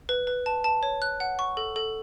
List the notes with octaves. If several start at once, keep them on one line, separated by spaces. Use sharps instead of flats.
B4
B4
A5
A5
C#5
F#6
F#5
C#6
A4
A4